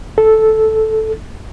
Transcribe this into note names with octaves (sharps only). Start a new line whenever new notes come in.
A4